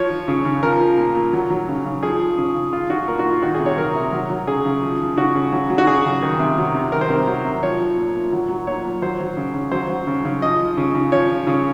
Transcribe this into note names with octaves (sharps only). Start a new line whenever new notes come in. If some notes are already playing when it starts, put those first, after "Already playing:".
Already playing: F3 C#5
F3
C#3
C#3
F3 A#4
F3
A#2
A#2
F#3
F#3
C#3
C#3
F3 G#4
F3
C#3
C#3
F3 F4
F3 F#4
A#2 A#4
F#4
A#2
F4
D#3 F#4
G#4
C3
C#5
F#3 A#4
C3
F#3
F#3
C#3 G#4
C#3
F3
F3
C#3 F#4
C#3
F#3
F#3
F#4
C#3 G#4
C#3
D#3
C3
F#3
C3
D#3 A#4
C5
C3 A#4
F#3
C3
F3 C#5
F3
A#2
A#2
F#3
F#3
A#2 C#5
A#2
F#3 C5
F#3
C#3
C#3
F#3 C5
F#3
C#3
C#3
F3 D#5
F3
C#3
C#3
F3 C#5
F3
C#3